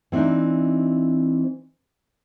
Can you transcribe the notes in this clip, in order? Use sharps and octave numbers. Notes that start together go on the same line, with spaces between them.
E3 C4 D4 D#4